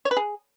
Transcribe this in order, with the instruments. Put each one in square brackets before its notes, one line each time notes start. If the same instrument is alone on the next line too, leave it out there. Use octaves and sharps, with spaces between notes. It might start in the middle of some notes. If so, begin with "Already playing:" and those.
[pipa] C#5
B4
G#4